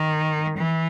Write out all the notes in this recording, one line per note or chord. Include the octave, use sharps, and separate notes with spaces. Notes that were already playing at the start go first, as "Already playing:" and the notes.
Already playing: D#3
E3